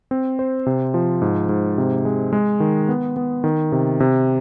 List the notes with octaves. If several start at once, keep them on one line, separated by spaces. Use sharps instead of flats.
C4
C5
C3
F3
G#2
G#2
C3
G#3
G#3
D#3
B3
B3
D#3
C3
C3